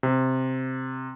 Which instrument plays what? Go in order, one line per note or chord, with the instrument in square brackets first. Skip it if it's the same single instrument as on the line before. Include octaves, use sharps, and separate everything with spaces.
[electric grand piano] C3